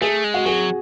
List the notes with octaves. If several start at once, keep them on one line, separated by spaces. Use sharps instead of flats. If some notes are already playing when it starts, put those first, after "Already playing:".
A3 G#4
G#3
F#4
F#3 G#4